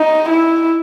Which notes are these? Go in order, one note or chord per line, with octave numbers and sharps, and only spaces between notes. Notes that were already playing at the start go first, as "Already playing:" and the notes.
Already playing: D#4
E4